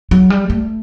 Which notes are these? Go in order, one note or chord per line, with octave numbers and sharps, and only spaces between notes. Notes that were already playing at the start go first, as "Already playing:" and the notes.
F#3
G3
A3